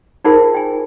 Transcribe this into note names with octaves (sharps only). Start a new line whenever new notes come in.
D#4 F4 G#4 A#4 C5 F#5
G5 G#5